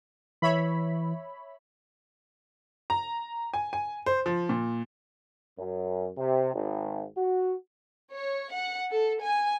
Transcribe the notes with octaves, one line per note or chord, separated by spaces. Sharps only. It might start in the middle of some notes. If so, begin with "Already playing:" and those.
E3 C#5 E5 B5
A#5
G#5
G#5
C5
F3
A#2
F#2
C3
G#1
F#4
C#5
F#5
A4
G#5